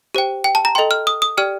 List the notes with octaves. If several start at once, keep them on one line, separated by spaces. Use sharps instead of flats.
G4 C5 G5
G5
A5
A#5
A4 D#5 G5 C6
F6
D#6
D#6
G4 D5 G5 F6